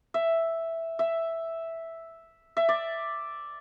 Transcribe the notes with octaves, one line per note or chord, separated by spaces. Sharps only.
E5
E5
E5
D5